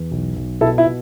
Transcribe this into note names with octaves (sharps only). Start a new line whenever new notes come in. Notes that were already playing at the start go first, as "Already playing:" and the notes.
Already playing: E2
B1
B1
B2 E4 A4
E4
B2